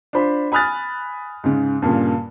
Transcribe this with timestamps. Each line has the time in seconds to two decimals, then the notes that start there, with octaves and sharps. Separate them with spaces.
0.13 D4 F4 C5 B5
0.52 G#5 B5 D#6 F6 F#6 A6
1.44 G#2 C#3
1.82 G2 A#2 C#3